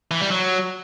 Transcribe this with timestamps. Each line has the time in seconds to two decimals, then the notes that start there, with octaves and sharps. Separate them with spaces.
0.11 E3
0.21 G3
0.30 F#3